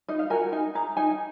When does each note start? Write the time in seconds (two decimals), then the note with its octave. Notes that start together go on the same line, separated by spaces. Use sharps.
0.08 D#4 D#5
0.19 F5
0.30 F#4 A#4 G#5
0.52 D#4 G#5
0.75 G#4 A#5
0.97 D#4 G#5